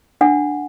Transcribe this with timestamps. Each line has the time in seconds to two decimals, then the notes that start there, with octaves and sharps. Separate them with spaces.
0.21 D4 F#5